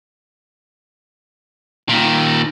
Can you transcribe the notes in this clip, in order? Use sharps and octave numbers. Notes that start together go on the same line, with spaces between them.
A#2 D#3